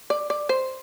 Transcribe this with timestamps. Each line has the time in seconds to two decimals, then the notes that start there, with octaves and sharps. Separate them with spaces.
0.10 D5
0.30 D5
0.49 C5